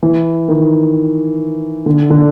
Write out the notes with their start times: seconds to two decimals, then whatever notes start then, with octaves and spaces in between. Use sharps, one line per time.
0.03 E3
0.48 D#3
1.86 D3
2.10 D3